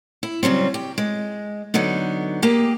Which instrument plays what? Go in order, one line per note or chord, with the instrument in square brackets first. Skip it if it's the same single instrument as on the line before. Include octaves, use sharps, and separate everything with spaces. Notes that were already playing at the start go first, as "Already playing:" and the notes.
[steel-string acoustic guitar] E4
C#3 F#3 G3 C4
G4
G#3
D3 F#3 B3 D#4
A#3 G4 G#4